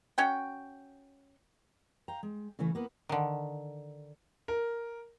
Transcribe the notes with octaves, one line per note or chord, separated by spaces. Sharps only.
C#4 F#4 G5
F5 G5 A#5
G#3
C#3 E3 A3 C#4
A#3 B3 B4
D3 D#3
A#4